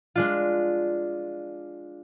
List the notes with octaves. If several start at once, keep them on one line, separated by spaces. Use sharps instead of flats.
G#3 D4 F4